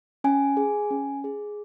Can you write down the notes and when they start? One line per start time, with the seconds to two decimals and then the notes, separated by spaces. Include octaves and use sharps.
0.24 C#4 G#5
0.57 G#4
0.91 C#4
1.24 G#4